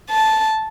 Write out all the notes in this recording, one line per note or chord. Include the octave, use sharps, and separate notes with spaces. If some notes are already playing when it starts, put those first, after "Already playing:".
A5